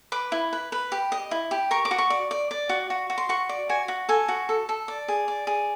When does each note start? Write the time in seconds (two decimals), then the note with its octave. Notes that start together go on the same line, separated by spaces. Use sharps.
0.12 B4 D6
0.32 E4
0.53 B4
0.72 B4
0.92 G4
1.12 D#5
1.31 E4
1.51 G4
1.71 A#4 C#6
1.85 D6
1.91 F#4
1.98 C#6
2.10 D5
2.31 D5
2.51 D5
2.69 F#4
2.90 F#4
3.10 F#4
3.18 C6
3.29 F#4 C#6
3.49 D5
3.69 F#4 G#5
3.88 F#4
4.09 A4 G#5
4.28 F#4
4.49 A4
4.69 A4
4.88 D5
5.08 G#4
5.28 D5
5.47 G#4